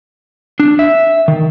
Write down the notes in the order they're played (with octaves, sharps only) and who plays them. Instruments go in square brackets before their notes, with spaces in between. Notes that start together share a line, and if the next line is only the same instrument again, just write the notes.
[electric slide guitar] D4
E5
D#3